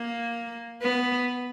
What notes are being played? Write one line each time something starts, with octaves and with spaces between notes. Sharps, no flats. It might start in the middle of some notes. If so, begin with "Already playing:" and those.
Already playing: A#3
B3